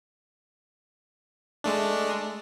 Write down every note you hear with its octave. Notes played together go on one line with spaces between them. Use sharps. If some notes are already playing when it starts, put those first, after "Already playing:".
G#3 A3 D4